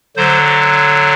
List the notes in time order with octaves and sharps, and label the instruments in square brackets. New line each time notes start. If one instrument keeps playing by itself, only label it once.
[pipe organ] D3 F#3 C5